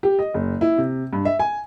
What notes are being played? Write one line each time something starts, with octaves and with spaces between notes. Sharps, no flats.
G4
D#5
F#1
E4
C3
G2
E5
G#5